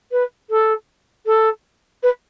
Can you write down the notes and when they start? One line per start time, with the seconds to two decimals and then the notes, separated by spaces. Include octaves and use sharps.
0.12 B4
0.50 A4
1.26 A4
2.03 B4